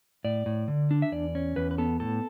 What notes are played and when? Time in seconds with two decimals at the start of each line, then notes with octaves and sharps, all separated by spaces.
0.25 A2 D5
0.46 A2
0.68 D3
0.91 D4
1.02 E5
1.12 E2 D5
1.35 C#4
1.56 E2 B4
1.71 B4
1.78 B3 A4
2.00 A2 A4